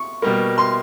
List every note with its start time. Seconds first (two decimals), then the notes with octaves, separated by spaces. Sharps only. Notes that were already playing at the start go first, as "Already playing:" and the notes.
Already playing: C#6
0.22 B2 G3 A#3
0.58 C6